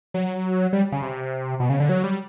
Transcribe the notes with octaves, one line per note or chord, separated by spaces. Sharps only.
F#3
G3
C#3
C3
B2
C#3
D3
F#3
G3